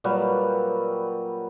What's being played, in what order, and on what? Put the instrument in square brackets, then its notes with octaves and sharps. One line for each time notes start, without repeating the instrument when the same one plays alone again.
[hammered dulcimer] A#2 F#3 G3 B4